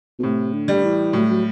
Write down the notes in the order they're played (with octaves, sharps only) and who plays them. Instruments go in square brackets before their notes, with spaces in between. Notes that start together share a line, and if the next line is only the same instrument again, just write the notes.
[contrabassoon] B2
[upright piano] A2 [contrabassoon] C3
[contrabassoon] D3
[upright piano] G3
[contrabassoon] E3
[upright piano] A2 [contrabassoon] F#3
[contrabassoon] F#3